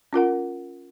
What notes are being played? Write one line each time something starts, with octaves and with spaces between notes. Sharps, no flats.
C#4 F4 A#4 F#5